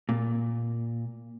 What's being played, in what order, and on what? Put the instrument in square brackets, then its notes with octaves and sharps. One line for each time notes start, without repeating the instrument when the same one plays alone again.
[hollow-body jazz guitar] A#2